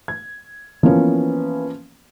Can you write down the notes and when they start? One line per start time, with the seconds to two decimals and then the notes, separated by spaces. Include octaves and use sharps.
0.08 G#6
0.83 E3 F3 A#3 B3 C#4